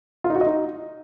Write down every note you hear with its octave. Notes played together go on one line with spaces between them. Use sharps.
F4
D#4
F#4
D#5
D#4